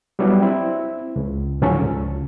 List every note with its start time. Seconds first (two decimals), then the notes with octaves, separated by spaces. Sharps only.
0.19 F#3 G3 B3 D4 E4
0.42 C4 E4
1.16 C#2
1.62 G#2 D3 F3 F#3 C#4 A4
1.83 C#2